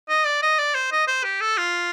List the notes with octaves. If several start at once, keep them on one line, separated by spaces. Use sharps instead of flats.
D#5
D5
D#5
D5
C5
D#5
C5
G4
A4
F4